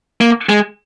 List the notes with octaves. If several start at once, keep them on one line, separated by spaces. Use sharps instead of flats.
A#3
G#3